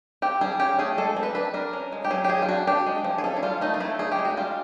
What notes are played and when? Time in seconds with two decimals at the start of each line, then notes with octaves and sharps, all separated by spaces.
0.22 C4 G4
0.41 G3 G#4
0.60 C#4 G4
0.78 A3 G#4
0.97 G#3 A4
1.16 C4
1.23 B4
1.35 D4 B4
1.54 D4 A#4
1.73 C#4
1.92 G#3
2.04 G4
2.10 F#3 G#4
2.24 G4
2.29 F#3 G#4
2.42 F4
2.48 D4 F#4
2.67 D4 G4
2.86 G#3
3.04 F3
3.18 G#4
3.24 C#4 A4
3.36 E4
3.42 G3 F4
3.61 A3 D#4
3.74 F4
3.80 A3 E4
3.99 D#4 G#4
4.12 G4
4.19 G#3
4.25 F#4
4.37 G3 F4